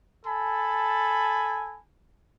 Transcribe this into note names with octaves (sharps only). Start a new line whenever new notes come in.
A4 G#5 A5 B5